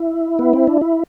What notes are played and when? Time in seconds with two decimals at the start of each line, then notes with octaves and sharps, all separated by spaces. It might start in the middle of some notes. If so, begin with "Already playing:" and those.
Already playing: E4
0.39 B3
0.53 C4
0.67 D4
0.81 E4